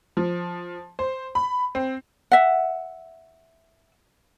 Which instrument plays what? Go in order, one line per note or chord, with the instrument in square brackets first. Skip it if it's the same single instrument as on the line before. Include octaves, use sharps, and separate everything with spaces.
[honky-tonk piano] F3
C5
B5
C4
[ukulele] E5 F#5